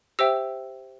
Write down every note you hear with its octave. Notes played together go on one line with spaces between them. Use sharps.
G4 C5 E5 G5 E6